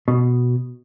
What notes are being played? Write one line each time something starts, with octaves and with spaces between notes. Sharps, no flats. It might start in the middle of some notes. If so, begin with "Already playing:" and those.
B2